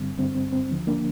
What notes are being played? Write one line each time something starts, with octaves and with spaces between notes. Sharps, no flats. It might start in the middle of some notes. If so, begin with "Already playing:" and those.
Already playing: G2 D3 G3 C4
G2 D3 G3 C4
C4
C4
D2 D3 F3
A#3 D4